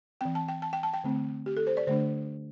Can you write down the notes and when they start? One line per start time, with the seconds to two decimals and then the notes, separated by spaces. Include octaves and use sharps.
0.21 E3 C4 G5
0.35 A5
0.48 G5
0.62 A5
0.73 G5
0.83 A5
0.94 G5
1.04 D3 A3 C4
1.46 G4
1.57 A4
1.67 C5
1.77 D5
1.87 D3 A3 D4 C5